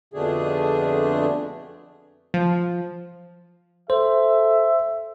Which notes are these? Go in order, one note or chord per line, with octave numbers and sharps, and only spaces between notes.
F2 B2 D3 A3 D4 G#4
F3
A4 C5 E5